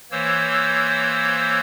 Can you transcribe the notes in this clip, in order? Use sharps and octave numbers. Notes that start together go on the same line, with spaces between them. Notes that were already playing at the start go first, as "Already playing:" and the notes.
E3 A#3 C5 C#5 E6